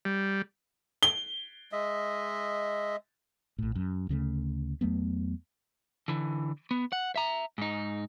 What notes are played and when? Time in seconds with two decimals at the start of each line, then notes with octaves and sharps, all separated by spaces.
0.05 G3
1.03 G7
1.72 G#3 D#5 E5
3.59 A#1 A2
3.75 F#2
4.09 D2 C#3 E3 A3
4.81 E2 F#3 A3 B3
6.08 D3 E3
6.71 B3
6.93 F#5
7.16 E5 A#5
7.58 G#2 D#4